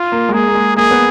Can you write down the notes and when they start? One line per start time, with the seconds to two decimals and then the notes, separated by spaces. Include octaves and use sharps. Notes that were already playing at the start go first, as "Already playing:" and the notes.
Already playing: F4
0.12 A#3
0.29 G#3
0.34 A#3 G#4
0.48 A#3
0.55 G#3
0.77 A#3 G#4
0.91 B3